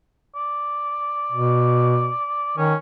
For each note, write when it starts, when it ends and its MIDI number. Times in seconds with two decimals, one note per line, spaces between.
0.36 2.57 74
1.32 2.12 47
2.58 2.74 51
2.58 2.75 61